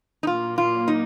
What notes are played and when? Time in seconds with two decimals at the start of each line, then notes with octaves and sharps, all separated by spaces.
0.23 D#4
0.27 A#2 F#3 A#3 F4
0.58 F4
0.88 D#4